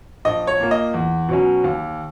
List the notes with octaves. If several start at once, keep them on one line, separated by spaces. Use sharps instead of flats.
A#1 D#5
C#5
A#2 A#3
D#5
E2
B2 F#3 C#4
D#2